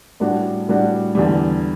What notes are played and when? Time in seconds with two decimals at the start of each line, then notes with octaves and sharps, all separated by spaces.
0.20 A2 G3 D4 F#4
0.69 A2 G3 D4 F#4
1.15 E2 D3 G3